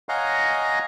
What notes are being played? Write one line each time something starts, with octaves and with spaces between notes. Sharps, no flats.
C#5 D#5 F5 F#5 G#5 A#5